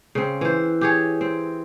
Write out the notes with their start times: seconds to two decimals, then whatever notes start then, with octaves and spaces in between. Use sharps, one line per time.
0.15 C#3 C4
0.41 E3 C5
0.81 G4 G#4 C#5
1.21 C4